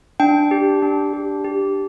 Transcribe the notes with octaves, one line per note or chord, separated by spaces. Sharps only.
D4 G5
G4
D4
G4
G4